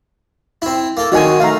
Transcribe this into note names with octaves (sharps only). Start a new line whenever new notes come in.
C4 E4
A#3 A4
D#3 F#3 C4 F#4 D#5 G#5
A3 F5 A#5